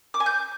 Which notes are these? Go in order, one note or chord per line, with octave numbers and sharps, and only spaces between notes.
D6
G#5
G6